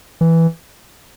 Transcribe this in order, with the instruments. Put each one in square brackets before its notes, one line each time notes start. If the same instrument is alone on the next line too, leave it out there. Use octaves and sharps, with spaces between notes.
[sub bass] E3